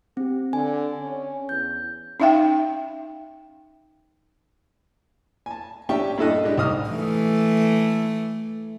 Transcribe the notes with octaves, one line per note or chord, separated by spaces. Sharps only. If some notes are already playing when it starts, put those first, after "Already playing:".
C4 G4
D3 G#5
C#4
E2 G6
C#4 D#4 E5 F5 G5
G#5 A5
C#4 D4 G4 E5 G5 C#6
G2 A#2 E4 A4 D#5 F#6
G#3 D4 G4
C2 D#4 D#6 F6
E3 A3